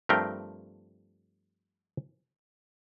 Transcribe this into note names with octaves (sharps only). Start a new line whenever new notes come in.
G2 F3 A3 C4 A#4 G5